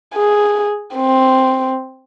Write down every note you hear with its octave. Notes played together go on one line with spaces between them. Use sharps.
G#4
C4